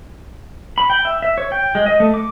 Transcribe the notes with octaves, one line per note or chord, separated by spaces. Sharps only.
B5
G5
E5
E5
C#5
G5
G#3
D#5
A3
D6